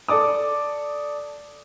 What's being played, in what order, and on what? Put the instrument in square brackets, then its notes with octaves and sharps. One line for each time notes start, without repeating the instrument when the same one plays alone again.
[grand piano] A4 D5 D6 D#6